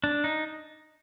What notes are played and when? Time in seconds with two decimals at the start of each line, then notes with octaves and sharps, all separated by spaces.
0.04 D4
0.24 D#4